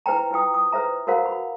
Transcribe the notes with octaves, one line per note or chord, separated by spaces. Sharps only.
E4 B4 C5 G5 A#5
E4 F4 B4 G5 D#6
D#6
B4 C5 E5 A#5
F#4 A#4 C5 F5 F#5 A#5
F#4 B5